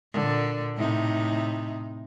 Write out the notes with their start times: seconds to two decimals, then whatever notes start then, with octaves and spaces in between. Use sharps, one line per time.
0.13 A#2 D3
0.76 A2 C3 D#4